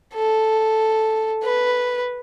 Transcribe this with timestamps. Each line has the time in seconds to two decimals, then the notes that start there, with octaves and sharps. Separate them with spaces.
0.14 A4
1.42 B4